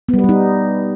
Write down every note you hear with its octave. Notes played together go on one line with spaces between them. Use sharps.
B3
G3
B4
G3
D#4